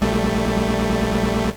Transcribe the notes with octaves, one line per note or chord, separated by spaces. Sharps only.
A#1 G3 A3